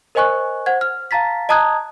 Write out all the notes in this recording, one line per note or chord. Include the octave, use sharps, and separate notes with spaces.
A#4 C5 D#5 G#5 C#6 F#6
C5 F#5 G#6
F6
F5 A5 A#5 A6 B6
D#5 A5 A#5 D#6 F#6 G#6